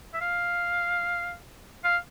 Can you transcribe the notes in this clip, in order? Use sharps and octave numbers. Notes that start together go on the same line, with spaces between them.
E5
F5
F5